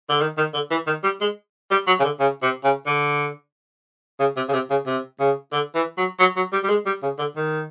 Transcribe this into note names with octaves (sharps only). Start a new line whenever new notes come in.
D3
D#3
D#3
D3
E3
D#3
G3
G#3
G3
F#3
C#3
D3
C#3
C3
C#3
D3
C#3
C3
C#3
C3
C#3
C3
C#3
D3
E3
F#3
F#3
F#3
G3
G3
G#3
G3
C#3
D3
D#3